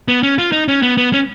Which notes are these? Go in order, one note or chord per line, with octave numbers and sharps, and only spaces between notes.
B3
C#4
F4
D#4
C#4
B3
B3
C#4